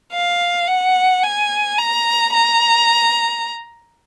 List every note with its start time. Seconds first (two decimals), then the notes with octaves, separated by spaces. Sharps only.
0.13 F5
0.68 F#5
1.23 G#5
1.78 A#5
2.34 A#5